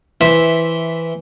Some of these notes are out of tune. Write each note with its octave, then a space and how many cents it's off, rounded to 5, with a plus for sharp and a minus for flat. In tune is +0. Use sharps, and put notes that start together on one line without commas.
E3 +0 C5 +0 E5 -10